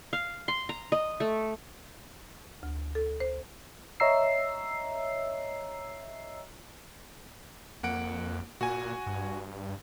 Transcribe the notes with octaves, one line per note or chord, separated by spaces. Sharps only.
F5
C6
A#5
D#5
A3
D2
A4
C5
C#5 D#5 E5 A#5 E6 C7
F2 A#3 F#5 D7
A#2 F#4 G#5
G2